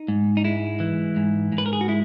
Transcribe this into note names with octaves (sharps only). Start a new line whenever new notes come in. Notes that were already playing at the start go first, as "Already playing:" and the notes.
Already playing: D#4
G#2
D#4
G#3 E4
E3
G#2
G#2
B4
A#4
G#4
F#4
G#3 E4